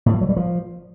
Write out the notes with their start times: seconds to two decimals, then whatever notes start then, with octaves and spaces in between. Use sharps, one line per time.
0.06 A2
0.14 F3
0.21 F#3
0.29 G3
0.36 F3